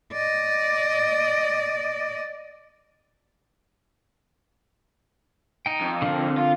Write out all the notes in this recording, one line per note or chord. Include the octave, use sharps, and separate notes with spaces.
D5 D#5
D#4 G5
F2
D3 C4 A#4
F4